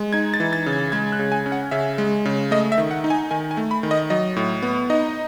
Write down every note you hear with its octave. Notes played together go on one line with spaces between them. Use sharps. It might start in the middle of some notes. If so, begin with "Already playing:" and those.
Already playing: G#3
D#4 G#6
A6
E3
A6
C#3
G#6
G#3 G#6
F#6
C#3
G#5
C#4
F#5
C#3 E5
G#3
C#3
A3 D#5
E5
D#3
F#5
D#4
G#5
D#3 G#5
G#5
A3
B5
D#3
D#5
F#3 D#5
A2
B3
D#4 D#5